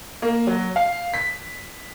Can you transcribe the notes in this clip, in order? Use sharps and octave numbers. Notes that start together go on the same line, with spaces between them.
A#3
F#3
F5
B6